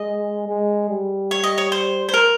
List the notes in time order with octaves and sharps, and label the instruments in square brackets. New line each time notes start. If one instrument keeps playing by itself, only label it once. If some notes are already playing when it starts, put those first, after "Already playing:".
Already playing: [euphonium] G#3 [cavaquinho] D#5
[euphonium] G#3
G3
[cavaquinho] C#5
D#5
C#5
C5
C5
A#4